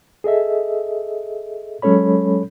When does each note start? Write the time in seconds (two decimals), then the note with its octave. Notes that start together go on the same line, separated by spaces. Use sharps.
0.24 G#4 A4 D#5 E5
1.82 F#3 G#3 C#4 A4 C#5 B5